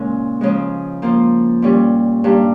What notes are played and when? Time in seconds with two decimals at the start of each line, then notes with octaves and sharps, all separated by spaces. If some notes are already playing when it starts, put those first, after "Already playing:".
Already playing: A#2 C#3 G#3 C#4 A#4
0.41 C#3 F3 G#3
1.02 F3 A#3 F4
1.62 A#2 G3 C#4
2.24 G2 G3 A#3